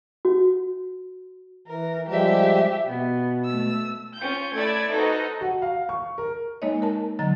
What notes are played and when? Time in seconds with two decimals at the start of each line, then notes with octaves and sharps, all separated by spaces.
0.25 F#4
1.68 E3 A#4
2.09 F3 G3 G#3 G4 E5
2.86 B2 B3
3.44 A3 E6
4.17 C#4 F4 G6
4.55 A3 E4 D5 E6 G#6 A6
4.91 D#4 F#4 A4 B4 C5 D#5
5.41 F#4
5.62 F5
5.89 C#6
6.18 A#4
6.62 G#3 A#3 D#4 C#5 D#5
6.82 A#4 A5
7.19 D3 F#3 D#5 A#5 A6